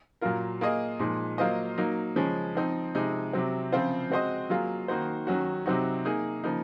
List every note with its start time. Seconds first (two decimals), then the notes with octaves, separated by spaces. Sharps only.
0.21 A#2 F#3 A#3 F4 A#4
0.61 A#3 F4 G#4 D#5
0.99 A#2 F3 G#3 D#4
1.38 F#3 A#3 F4 C5 D#5
1.78 F#3 A#3 D#4
2.16 C#3 F3 G#3 C#4
2.55 F3 C4 D#4
2.95 C3 F3 G#3 D#4
3.33 C3 F#3 C4
3.72 C#3 F3 C4 F4 C5
4.10 G#3 C4 F#4 C5 D#5
4.50 F#3 A#3 F4 G#4
4.88 D#3 A#3 D#4 F#4 C5
5.27 D#3 F#3 C#4 F#4
5.66 C3 F#3 C4 D#4 F#4
6.05 A#3 D#4 G#4
6.44 C#3 F3 A#3 D#4